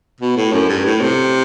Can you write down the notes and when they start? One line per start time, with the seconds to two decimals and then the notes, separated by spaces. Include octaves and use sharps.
0.21 B2
0.37 A2
0.53 F#2
0.69 G2
0.85 A2
1.01 C3